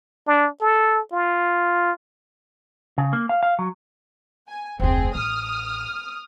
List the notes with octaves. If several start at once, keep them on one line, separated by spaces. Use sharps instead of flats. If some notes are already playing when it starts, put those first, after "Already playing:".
D4
A4
F4
C#3
A#3
F5
F5
F#3
G#5
F1 D2 C4 G#4
A1 D#6 F6